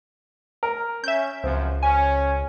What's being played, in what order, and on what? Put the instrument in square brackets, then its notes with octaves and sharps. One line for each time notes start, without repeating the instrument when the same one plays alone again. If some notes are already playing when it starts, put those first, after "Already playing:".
[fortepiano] A#4
[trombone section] C#4 [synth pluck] E5 G6
[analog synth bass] C#2 [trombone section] F#2 F3 [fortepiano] C4
[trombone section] C#4 [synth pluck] G#5